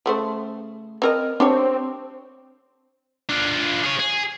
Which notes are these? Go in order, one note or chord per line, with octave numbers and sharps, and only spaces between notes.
C#3 A3 C5
C4 A#4 D#5
C4 D4 G4 C#5
D4 F4
G#4 C#5
G#4